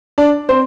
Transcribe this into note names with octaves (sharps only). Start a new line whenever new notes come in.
D4 D5
C4 C5